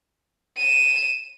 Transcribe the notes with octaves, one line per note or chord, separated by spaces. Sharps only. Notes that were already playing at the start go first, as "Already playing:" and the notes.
D#7 E7